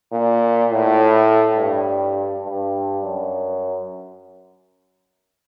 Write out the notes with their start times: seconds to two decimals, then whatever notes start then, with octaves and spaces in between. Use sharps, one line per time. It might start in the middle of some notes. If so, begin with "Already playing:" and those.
0.13 A#2
0.71 A2
1.57 G2
2.46 G2
3.03 F#2